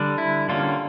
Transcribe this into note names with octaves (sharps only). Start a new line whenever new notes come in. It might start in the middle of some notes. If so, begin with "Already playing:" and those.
Already playing: D3 G3 D4
E4
D3 G3 A#3 C#4 F4